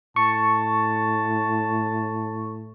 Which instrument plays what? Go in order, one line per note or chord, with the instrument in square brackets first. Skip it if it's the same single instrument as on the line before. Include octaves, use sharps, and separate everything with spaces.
[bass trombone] A2 [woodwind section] A5 [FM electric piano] C#6